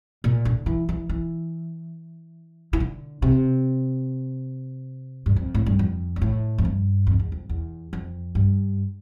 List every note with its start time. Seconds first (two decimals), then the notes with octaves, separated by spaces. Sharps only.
0.24 A#2
0.45 D3
0.66 E3
0.89 E3
1.09 E3
2.73 E3
2.80 D3
3.22 C3
5.26 G2
5.36 F2
5.55 A2
5.66 G2
5.79 F2
6.16 G2
6.22 A2
6.58 F2
6.65 G2
7.07 F2
7.19 E2
7.32 F2
7.49 E2
7.93 F2
8.35 G2